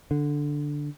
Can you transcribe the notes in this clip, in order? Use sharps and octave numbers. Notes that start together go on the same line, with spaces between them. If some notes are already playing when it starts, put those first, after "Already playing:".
D3